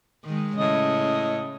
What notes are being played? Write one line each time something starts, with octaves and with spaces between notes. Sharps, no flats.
D#3 G#3
A2 C#3 D#5